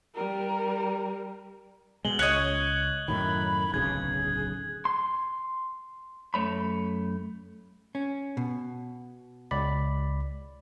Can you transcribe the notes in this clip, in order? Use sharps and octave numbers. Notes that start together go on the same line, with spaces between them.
G3 A#4
B2 G#3 F#7 G7
C#2 C#5 D#5 F#6 G#6
F#2 A2 D#3 B5
D1 B1 C#3 G#4 G#6
C6
F#2 A3 C#5 B5
C#4
B2
C#2 D5 B5